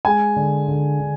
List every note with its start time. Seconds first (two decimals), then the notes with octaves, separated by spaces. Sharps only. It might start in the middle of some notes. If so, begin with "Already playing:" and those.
0.05 G#3 G#5
0.36 D3
0.68 D3
1.00 D3